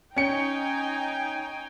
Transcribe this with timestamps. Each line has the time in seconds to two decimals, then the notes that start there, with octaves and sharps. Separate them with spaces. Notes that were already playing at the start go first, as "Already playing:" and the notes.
0.16 C#4 D#4 G5 G#5 C#7